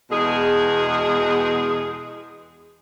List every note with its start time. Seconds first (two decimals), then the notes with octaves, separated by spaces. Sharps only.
0.11 E2 B2 G#3 G#4